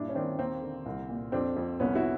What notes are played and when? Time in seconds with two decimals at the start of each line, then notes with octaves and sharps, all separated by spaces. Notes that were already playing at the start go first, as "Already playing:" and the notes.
Already playing: G2 A#2 D4 E4
0.09 C#4
0.15 D#3 C4 D4
0.39 D#2 A#3 C4
0.62 D3
0.86 C2
1.09 A#2
1.32 F2 C4 D4
1.56 F2
1.80 C2 B3 C#4
1.95 E4 F#4